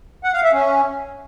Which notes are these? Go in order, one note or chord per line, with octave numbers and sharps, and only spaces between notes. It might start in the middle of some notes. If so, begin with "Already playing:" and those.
F#5
F5
E5
C#4